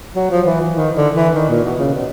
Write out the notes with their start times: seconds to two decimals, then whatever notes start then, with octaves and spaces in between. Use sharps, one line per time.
0.16 F#3
0.30 F3
0.46 E3
0.61 E3
0.76 D#3
0.95 D3
1.15 E3
1.35 D#3
1.49 A#2
1.64 B2
1.79 C#3
1.95 B2